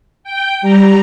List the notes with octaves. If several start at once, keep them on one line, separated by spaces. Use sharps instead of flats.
G5
G3 A#5